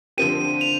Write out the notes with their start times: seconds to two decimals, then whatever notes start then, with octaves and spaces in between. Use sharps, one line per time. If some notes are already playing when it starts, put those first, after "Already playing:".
0.18 D3 F3 C4 G4 D#7
0.61 F7